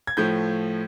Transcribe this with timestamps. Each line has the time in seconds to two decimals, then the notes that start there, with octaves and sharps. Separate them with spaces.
0.07 G#6
0.17 A2 F3 A3 G6